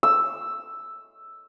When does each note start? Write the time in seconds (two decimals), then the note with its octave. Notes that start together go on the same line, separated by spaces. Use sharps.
0.03 E6